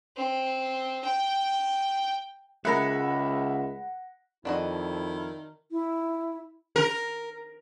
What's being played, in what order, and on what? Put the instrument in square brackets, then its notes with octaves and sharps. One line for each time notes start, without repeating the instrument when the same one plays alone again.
[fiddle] C4
G5
[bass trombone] C#2 [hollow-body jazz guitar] G#3 A#4 [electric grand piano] E5 B5 A#6 [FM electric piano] F#5
[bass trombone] F2 [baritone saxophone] D#3 [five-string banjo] D4 F#4 D#5 [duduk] E4
[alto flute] E4
[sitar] A#4